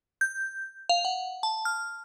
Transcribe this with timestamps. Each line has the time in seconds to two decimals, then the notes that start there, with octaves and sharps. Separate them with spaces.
0.21 G6
0.89 F5
1.05 F#5
1.43 A5
1.65 F6